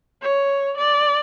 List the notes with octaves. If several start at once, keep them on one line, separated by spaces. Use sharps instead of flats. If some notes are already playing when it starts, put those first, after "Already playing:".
C#5
D5